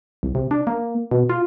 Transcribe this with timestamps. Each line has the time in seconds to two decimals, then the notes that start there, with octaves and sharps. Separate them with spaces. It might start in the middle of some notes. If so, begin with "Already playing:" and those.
0.23 C2
0.35 C3
0.51 D4
0.67 A#3
1.11 B2
1.29 F4